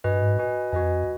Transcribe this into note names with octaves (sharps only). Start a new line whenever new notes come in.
G2 F#4 B4 D#5 G#5
G#2
F#4 B4 D#5 G#5
F2 F#4 B4 D#5 G#5